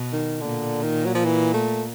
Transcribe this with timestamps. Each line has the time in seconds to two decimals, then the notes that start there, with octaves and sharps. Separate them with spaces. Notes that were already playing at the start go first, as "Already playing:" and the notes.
Already playing: B2
0.13 D#3
0.41 A#2 D3
0.83 D#3
1.05 F#3
1.15 F3
1.25 E3
1.53 A3